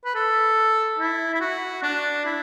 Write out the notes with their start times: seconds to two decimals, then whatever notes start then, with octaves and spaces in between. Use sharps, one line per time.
0.05 B4
0.15 A4
0.99 E4
1.34 E4
1.41 F#4
1.83 D4
2.25 E4